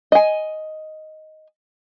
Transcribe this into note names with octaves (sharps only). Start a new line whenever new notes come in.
D#5 G#5